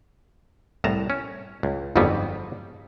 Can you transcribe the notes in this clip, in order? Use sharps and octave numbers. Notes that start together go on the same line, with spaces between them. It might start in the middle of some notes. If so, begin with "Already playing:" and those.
C2 A2 A5 A#5
C#4
C#2
G1 F2 G#2 F#3 G3 B3